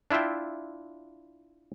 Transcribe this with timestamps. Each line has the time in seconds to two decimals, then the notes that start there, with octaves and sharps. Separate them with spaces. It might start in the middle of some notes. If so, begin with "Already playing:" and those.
0.11 D4 E4 F4 E5 G5